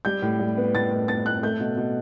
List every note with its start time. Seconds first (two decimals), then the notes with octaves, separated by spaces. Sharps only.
0.05 G3 G6
0.22 A2
0.39 G3
0.57 B3
0.74 A2 A6
0.91 A2
1.08 B3 A6
1.26 A2 F#6
1.43 A3 G6
1.60 B2
1.77 B2